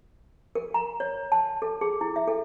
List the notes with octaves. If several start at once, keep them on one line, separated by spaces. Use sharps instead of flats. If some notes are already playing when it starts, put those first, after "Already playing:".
A#4
A#5
C#5
A5
A4
G#4
E4
E5
A4